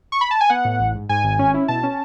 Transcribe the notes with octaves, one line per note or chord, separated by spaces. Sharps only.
C#6
B5
A5
G#5
B3 F#5
A2
A1
G#2
G#2 G#5
G#1
C#4
E4
B2 A5
C#4